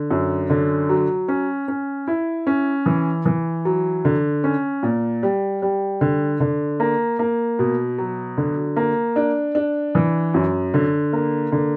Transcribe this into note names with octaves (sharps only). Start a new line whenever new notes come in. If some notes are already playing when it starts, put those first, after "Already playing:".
Already playing: D3
F#2
D3
F#3
C#4
C#4
E4
C#4
E3
E3
F#3
D3
C#4
A#2
G3
G3
D3
D3
A#3
A#3
B2
F#3
D3
A#3
D4
D4
E3
F#2
D3
A#3
D3